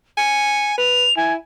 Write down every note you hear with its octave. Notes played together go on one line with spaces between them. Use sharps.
G#5 C#7
B4 F7
E4 G#5